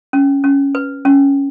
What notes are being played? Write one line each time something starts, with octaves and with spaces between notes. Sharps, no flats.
C#4
C#4
B4
C#4